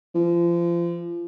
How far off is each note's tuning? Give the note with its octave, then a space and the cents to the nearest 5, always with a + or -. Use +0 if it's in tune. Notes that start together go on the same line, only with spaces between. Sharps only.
F3 -30